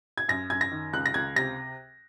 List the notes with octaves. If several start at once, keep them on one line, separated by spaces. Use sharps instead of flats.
G#6
F#2 A#6
F#2 G#6
A#6
D#3
C#2 F#6
A#6
C#2 G#6
C3 A#6